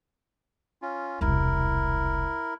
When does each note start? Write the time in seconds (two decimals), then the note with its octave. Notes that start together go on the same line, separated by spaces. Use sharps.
0.82 C#4 F4
1.21 E1 C2 E4 A#4